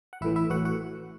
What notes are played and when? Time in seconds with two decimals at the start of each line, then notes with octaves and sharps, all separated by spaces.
0.13 F#5
0.21 A1 A2 E3 E4 E5
0.36 E4 E5
0.50 A1 A2 E3 F#4 F#5
0.65 F#4 F#5